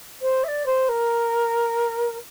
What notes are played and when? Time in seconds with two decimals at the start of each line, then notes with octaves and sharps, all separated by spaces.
0.22 C5
0.44 E5
0.48 D5
0.66 C5
0.89 A#4